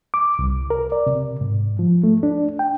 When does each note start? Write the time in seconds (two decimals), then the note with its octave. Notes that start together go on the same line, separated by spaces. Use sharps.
0.14 D6
0.39 C2
0.70 A#4
0.92 D5
1.07 C3
1.41 G#2
1.79 F3
2.04 A3
2.23 D4
2.59 G5